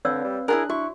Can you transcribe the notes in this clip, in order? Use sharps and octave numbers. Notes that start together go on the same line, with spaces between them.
D3 C4 B4 C#5 D5 F5 E6
G3
D4 E4 F4 G#4 A#4 F#6
E4 F#4 C#6